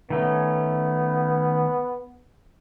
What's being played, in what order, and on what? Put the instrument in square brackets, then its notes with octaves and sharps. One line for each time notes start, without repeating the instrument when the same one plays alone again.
[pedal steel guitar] D#3 A3 C#4 [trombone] B3